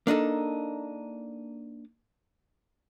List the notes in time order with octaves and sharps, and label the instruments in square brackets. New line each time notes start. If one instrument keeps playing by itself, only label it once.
[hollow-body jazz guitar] A#3 D4 D#4 A4